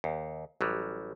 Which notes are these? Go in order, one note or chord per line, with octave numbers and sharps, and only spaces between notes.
D#2
A1 F#3 G3